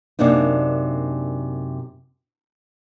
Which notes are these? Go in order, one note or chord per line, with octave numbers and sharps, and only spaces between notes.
F#2 C3 A#3 D4 D#4